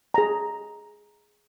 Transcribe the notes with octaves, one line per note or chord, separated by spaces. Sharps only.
G#4 A#5